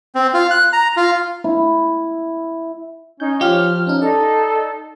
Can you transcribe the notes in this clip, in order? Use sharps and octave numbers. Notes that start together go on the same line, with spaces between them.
C4
F4
F#6
A#5
F4
E4
C#4 D#4 G6
F3 F4 G4 C#5 F6
C#4 D#4
D#4 A4 D5 A#5